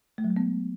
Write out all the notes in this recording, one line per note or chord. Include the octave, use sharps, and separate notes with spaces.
A3
F#3
G#3
B3